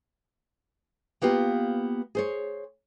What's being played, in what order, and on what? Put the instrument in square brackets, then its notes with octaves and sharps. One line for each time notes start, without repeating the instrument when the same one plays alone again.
[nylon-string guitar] A#3 B3 F4 G4
G#4 C5 C#5